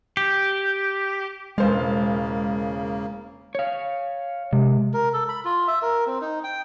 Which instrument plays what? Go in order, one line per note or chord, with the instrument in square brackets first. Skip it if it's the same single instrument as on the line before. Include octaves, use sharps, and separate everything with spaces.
[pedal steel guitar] G4
[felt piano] E1 C5 F5 [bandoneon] C#3 A#3 [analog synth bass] G#3
[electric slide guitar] C#5 F5
[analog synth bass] C3 [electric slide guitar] G#3
[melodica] A#4
A4
B5
F4
E5
A#4
C4
D#4
G5